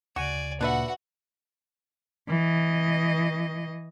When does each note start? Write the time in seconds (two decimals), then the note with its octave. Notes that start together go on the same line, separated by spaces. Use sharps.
0.16 D2 C#3 F#4 D5 G#5
0.61 A#2 D4 F#4 B4 E5 F#5
2.28 E3 D#5